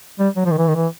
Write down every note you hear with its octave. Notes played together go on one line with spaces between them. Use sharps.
G3
F#3
F3
D#3
E3
D#3
E3